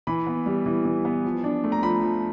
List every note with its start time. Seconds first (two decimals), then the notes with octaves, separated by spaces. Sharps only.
0.07 E3 B5
0.27 B3
0.46 G3
0.66 E3
0.85 E3
1.05 B3
1.25 F3
1.44 D4
1.64 A3
1.72 A#5
1.83 F3 B5
2.03 F3